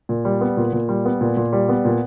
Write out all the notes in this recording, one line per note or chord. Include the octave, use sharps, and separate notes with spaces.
A#2
G3
B3
A#2
A#2
G3
B3
A#2
A#2
G3
B3
A#2